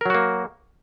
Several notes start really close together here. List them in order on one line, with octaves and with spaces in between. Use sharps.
A#4 F#3 F#4 A#3